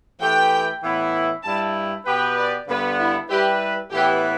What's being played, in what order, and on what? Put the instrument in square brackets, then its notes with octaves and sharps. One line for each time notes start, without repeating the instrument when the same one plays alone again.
[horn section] E3 A3 G4 B4 [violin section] G5
[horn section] A2 E3 B3 E4
[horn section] G2 G3 E4 [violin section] A5
[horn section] B2 B3 G4 B4 [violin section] G5
[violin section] D5
[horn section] G2 D3 B3 [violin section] B4
[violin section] E4
[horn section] G3 E4 B4 [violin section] G4
[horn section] A2 E3 B3 E4 B4 [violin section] G4